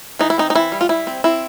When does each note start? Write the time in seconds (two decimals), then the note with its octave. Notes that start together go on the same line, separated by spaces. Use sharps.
0.19 E3 D#4
0.30 E4
0.38 C4 D#4
0.50 D#4
0.55 E3 E4
0.72 G3
0.81 F4
0.89 G3 E4
1.07 C4
1.24 C4 E4